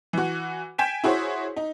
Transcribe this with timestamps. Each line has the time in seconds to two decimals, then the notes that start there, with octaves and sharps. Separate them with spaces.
0.13 E3 F#4
0.78 G5 G#5 G6 B6 E7
1.04 E4 F#4 G#4 C5 C#5
1.56 D#4